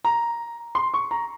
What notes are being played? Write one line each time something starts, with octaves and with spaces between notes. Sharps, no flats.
A#5
C6
C#6
A#5